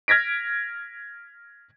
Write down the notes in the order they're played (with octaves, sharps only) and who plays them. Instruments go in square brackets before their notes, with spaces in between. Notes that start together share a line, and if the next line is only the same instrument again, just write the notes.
[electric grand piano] F6 G#6 A#6 B6 D7